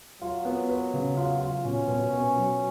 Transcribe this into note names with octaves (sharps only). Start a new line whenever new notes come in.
F#3 F4
B3
B4
C#3
F4
F4
B2 C#4
B2
B3
F#3